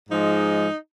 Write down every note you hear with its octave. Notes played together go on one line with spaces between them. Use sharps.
G#2 F3 G#3 D#4